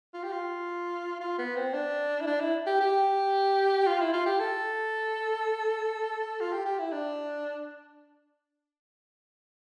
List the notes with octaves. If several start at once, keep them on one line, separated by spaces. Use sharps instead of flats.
F4
G4
F4
F4
B3
C4
D4
E4
D4
E4
G4
G4
F4
E4
F4
G4
A4
F4
G4
G4
E4
D4